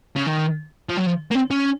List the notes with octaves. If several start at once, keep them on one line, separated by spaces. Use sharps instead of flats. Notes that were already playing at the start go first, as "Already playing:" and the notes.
C#3
D#3
F3
F#3
F3
A#3
C4
C#4